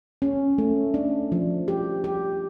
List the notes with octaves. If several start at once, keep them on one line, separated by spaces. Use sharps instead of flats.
C#4
A3
D4
F3
G4
G4